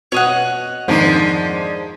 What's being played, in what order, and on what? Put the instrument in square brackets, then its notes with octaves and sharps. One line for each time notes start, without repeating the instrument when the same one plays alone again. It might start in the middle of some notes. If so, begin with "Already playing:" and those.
[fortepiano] B2 [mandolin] C#5 D#5 F#5
[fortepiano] F2 G#2 D#3 [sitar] F3 G#3 D4